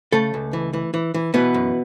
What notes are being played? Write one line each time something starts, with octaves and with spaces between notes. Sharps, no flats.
C#3 A3 A4
C#2
E3
E3
E3
E3
B2 E3 B3
F#2